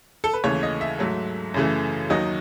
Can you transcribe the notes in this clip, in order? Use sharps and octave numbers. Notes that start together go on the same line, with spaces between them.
A4
B4
D#2 C#3 E3 A3 C#5
D#5
E5
G#2 F#3 A3
F#2 C#3 E3 A3
D#2 D#3 F#3 D#5